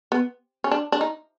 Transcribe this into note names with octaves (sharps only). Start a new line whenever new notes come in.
B3
C#4
D4
D4
D#4